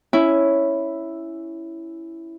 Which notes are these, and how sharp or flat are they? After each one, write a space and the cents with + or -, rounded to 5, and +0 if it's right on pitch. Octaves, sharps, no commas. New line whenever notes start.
C#4 +0 E4 +0